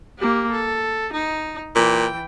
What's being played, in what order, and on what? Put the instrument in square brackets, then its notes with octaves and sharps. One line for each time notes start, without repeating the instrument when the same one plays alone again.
[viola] A#3 G4
A4
D#4
[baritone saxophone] A#2 [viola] E3 G5